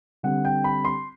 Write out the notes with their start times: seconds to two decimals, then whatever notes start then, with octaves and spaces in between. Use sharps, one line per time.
0.23 D3 G3 C4 F#5
0.45 G5
0.64 B5
0.85 C6